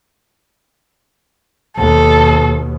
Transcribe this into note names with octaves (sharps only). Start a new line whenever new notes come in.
D#2 B2 A4